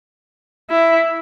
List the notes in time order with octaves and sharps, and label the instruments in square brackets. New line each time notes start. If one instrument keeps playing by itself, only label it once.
[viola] E4